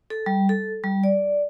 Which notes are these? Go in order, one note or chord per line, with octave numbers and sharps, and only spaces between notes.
A4
G3
A4
G3
D5